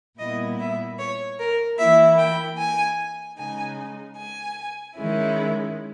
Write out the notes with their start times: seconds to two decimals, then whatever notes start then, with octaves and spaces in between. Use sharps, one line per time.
0.19 A#2 G3 B3 E4 D#5
0.59 E5
0.98 C#5
1.39 A#4
1.78 E3 A#3 E4 E5
2.18 G5
2.58 G#5
3.38 C#3 G#3 D#4 G#5
4.17 G#5
4.96 D#3 G#3 C#4 E4